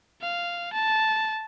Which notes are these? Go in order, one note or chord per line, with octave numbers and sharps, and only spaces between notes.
F5
A5